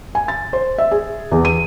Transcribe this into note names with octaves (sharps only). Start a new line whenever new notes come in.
G#5
A6
C5
E5
G#4
E2
D#7